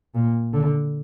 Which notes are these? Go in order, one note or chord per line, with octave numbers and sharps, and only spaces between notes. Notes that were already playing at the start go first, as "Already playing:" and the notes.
A#2
D3